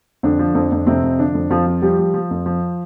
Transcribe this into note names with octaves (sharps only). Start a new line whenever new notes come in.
F2 D3 D4
F3
F2
F2
F2 C3 C4
F2
D3 F3 D4
F2
F2 F3 F4
F3
F3 G3 G4
F3
F3
F2
F3